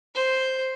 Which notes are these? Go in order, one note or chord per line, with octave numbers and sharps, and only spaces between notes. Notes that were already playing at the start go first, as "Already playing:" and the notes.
C5